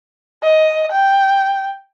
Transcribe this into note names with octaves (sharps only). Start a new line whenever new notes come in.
D#5
G5